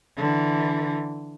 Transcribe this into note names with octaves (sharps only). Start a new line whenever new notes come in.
D3 E3